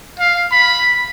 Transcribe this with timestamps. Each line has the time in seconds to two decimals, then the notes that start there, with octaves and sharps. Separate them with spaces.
0.20 F5
0.51 B5